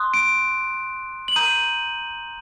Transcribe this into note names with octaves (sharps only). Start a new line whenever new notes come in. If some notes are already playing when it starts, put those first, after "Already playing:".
Already playing: C6 D#6 F#6
D7
F#7
A#5 D#6 G6 D#7